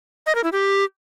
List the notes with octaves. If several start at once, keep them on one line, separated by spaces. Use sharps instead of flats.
D#5
A#4
E4
G4